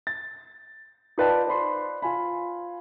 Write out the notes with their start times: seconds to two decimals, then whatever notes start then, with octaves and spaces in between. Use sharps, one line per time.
0.07 A6
1.18 D#4 F4 B4 D5 G5 A5
1.47 C5 D5 B5 C6
2.02 F4 G#5 B5